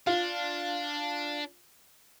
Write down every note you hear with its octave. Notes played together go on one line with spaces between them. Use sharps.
D4 F4